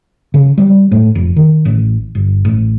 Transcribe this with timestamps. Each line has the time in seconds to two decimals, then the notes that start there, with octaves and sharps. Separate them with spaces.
0.34 C#3
0.58 G3
0.91 A2
1.15 F1
1.36 D#3
1.65 A1
2.15 G1
2.45 A1